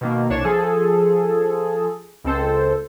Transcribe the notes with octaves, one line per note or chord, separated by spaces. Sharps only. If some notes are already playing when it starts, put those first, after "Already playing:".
B2 D#3 A#3
C2 D4 C#5 E7
F3 G#4 A4
C#2 C4 A4 C5